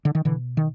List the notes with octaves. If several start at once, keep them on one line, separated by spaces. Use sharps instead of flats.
D3
D#3
B2 D3 E3
D#3